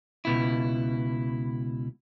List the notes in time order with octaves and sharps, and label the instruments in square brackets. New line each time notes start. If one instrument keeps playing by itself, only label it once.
[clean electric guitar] C#2 B2 E4